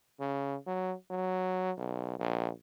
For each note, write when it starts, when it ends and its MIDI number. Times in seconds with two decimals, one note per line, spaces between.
0.20 0.56 49
0.67 0.94 54
1.10 1.71 54
1.78 2.17 35
2.19 2.50 34